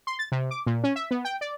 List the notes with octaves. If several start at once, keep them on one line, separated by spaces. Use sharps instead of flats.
C6
A6
C3
D6
A#2
C#4
E5
B3
G5
D5